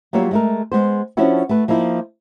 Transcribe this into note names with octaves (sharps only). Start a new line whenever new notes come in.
F#3 G3 A#3 F4 C#5 E5
G#3 A3 A#4
G#3 B3 C5
F3 C#4 D4 E4 F#4
A3 B4
F3 A#3 D#4 E4